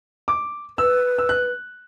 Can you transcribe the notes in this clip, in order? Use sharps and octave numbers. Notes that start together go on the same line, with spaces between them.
D6
B4 E6
E6
F#6